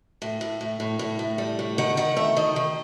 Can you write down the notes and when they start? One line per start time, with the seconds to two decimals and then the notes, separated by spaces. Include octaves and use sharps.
0.22 A2
0.41 A2
0.61 A2
0.80 A2
0.99 A2
1.19 A2
1.38 G3
1.59 A2
1.78 D#3 F#5
1.97 D#3 F#5
2.17 A3 E5
2.37 D#3 D#5
2.56 D#3